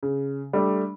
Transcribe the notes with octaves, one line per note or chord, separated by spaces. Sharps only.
C#3
G3 A3 D4